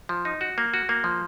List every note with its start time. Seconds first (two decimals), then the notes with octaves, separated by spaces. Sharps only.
0.09 F3
0.25 D#4
0.41 F#4
0.58 A#3
0.74 F#4
0.89 A#3
1.04 F3